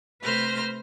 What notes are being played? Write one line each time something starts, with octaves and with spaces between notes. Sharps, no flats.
C3 A3 B4 C5 F6 A#6